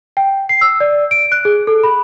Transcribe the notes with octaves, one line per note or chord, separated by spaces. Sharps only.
G5
C7
E6
D5
D7
F#6
G#4
A4
B5